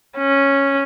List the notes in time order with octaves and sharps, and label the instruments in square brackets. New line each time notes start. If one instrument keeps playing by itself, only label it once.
[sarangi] C#4